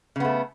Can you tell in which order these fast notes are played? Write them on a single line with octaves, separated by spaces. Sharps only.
C#3 B3 A3